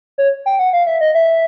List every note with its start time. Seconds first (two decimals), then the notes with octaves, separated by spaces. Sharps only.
0.18 C#5
0.46 G5
0.59 F#5
0.73 F5
0.87 E5
1.01 D#5
1.15 E5